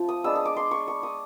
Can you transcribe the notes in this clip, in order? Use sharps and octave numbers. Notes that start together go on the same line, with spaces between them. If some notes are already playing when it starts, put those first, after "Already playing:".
Already playing: F3 A3 C4 F4
D#6
G#3 B3 D4 E6
D#6
D6
C6
C#6
C#6
D#6